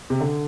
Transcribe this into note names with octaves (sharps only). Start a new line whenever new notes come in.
C3
D3